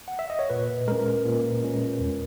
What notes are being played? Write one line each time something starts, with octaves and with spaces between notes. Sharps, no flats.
F#5
E5
D#5
C#5
A#2 B4
G#3 C#4 A#4
A#2
G#3 C#4
E2